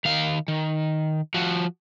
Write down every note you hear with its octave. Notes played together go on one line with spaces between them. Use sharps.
D#3 F5
D#3
F3 F#4